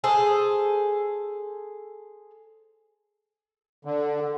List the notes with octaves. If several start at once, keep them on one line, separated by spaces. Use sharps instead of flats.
G#4 A4 C5
D3